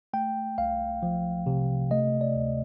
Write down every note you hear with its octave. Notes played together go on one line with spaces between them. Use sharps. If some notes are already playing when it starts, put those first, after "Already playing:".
A3 G5
C2 F5
F3
C3
A3 D#5
D5
D2